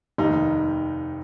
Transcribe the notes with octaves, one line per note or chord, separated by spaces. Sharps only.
F1 D#2 D#3 D#4